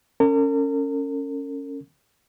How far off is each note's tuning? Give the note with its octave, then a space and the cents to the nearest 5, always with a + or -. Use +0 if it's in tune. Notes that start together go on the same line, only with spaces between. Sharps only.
C#4 +0 A#4 -40